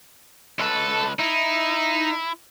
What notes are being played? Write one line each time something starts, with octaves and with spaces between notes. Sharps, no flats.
C#2 A4 B4
D#4 E4